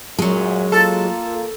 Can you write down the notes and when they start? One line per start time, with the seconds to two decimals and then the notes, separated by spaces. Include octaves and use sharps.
0.19 F#2 A#2 F#3 G#3
0.72 A#3 F4 A4